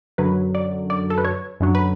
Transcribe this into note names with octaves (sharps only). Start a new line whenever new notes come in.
F#2 D3 F#3 B4
D5
D5
A4
B4
C#5
F#2 D3 F#3
B4